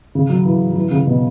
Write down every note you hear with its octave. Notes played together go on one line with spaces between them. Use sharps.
C#3
F#3
E3
F#3
E3
C#3
B2